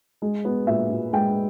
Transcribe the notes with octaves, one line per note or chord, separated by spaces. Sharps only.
G#3
B3
A#2 E5
A#2
G#3 G5